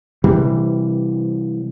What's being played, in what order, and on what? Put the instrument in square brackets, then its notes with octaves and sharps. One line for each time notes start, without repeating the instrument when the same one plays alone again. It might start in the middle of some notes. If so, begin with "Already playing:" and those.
[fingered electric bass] C3 E3 G3